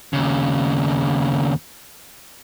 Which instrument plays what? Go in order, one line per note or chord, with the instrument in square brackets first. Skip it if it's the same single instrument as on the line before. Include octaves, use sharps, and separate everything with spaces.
[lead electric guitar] D#2 C#3